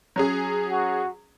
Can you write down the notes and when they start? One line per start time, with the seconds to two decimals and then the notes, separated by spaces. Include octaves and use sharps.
0.16 F#3 C#4 G#4
0.69 F#4